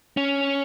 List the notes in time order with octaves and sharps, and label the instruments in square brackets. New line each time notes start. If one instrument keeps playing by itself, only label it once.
[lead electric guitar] C#4